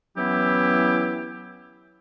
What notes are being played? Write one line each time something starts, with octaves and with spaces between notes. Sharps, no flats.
E3 F#3 B3 C#4 E4 G4